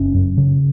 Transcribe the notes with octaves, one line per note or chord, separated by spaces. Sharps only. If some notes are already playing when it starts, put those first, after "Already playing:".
Already playing: F#1 C#4
F#2
C#3